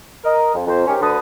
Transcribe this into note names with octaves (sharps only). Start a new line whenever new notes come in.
A#4 D#5
F2
F2 C5
G#2 C#4 G4 A#4 C5 C#5
D2 D3 B4 A5 D#6